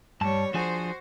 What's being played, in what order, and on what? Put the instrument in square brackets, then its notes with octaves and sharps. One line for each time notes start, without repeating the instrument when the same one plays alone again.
[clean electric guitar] G2 A5 [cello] G3 C#5
[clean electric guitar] F3 D4 G#4 [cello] F#4 C5